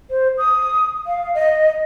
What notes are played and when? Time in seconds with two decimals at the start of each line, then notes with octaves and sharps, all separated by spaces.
0.10 C5
0.38 D#6
1.07 F5
1.35 D#5